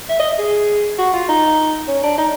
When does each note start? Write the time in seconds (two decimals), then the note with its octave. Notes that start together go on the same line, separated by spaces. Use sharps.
0.09 E5
0.19 D#5
0.39 G#4
0.98 F#4
1.13 F4
1.29 D#4
1.88 C#4
2.03 D4
2.18 D#4